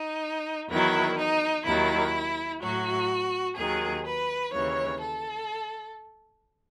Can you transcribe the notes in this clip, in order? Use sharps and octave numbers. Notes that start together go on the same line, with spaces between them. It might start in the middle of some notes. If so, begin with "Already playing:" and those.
Already playing: D#4
E2 D#3 F#3 E4
D#4
D#2 D#3 F#3 E4
A2 F#3 F#4
D#2 D#3 F#3 G#4
B4
D#2 C#3 E3 C#5
A4